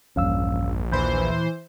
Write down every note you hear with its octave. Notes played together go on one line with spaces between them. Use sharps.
A#1 E2 G2 C#4 F5 E6
D#2 A#2 E3 C5 B5 G6